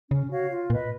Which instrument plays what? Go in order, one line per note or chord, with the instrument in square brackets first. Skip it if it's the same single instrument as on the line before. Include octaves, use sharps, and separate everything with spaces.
[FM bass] C#3 [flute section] C#4
[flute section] F#4 C#5 F5
F4
[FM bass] A#2 [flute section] B4 D#5